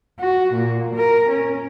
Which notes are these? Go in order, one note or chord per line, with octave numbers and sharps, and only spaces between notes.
F#4
A#2
A#4
C#4